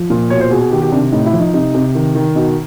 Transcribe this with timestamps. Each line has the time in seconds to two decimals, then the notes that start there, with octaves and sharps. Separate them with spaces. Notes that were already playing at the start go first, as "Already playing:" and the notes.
Already playing: F3
0.10 A#2
0.30 B2 C#5
0.40 C5
0.51 B2 G#4
0.61 G#4
0.71 D#3 G4
0.82 G4
0.92 C3 D4
1.12 A2 D#4
1.26 E4
1.33 F3
1.40 D#4
1.54 C3 D#4
1.74 C3
1.95 D#3
2.15 D#3
2.36 B2 D#4